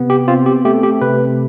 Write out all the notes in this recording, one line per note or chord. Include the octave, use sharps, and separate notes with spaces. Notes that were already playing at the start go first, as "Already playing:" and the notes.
Already playing: C3 B3
G4
C4 F4
G4
A3 G4
G4
C3 B4